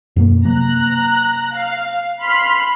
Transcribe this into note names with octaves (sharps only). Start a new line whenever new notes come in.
F#2 B2 A#3
C3 F#3 A#3 A#5 F#6
F5
B5 C6 F6